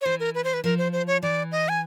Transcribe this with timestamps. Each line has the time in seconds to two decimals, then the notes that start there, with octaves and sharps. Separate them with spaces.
0.01 C#5
0.05 E3 C5
0.20 A#4
0.35 B4
0.44 C5
0.54 B4
0.64 F3 A#4
0.78 C5
0.93 C5
1.07 C#5
1.23 E3 D5
1.52 D#5
1.69 G#5